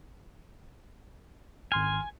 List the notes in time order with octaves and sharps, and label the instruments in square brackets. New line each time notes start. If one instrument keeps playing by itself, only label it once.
[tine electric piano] G#1 C6 F6 [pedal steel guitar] G#5